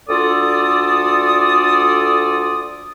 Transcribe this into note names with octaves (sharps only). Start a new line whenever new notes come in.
D2 F4 A4 D5 D#6